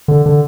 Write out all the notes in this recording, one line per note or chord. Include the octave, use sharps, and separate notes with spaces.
D3
D3